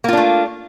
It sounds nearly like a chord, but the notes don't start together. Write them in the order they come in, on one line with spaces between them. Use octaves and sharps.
A#3 F4 D4 A3